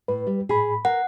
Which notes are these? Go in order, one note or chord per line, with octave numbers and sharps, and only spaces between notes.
A2 B4
G3
A2 G#4 B5
A#4 F#5